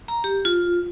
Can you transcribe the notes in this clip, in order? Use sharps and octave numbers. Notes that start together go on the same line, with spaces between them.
A#5
G4
F4